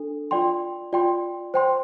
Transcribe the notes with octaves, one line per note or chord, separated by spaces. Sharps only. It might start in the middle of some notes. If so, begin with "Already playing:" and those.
Already playing: D4 A4
F4 D5 G5 C6
F4 D5 G5 C6
C5 G5 C6